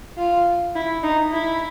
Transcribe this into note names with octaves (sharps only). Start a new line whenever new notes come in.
F4
E4
D#4
E4